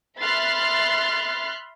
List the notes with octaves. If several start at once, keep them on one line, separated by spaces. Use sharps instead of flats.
E5 B5 C6 F6 F#6 A6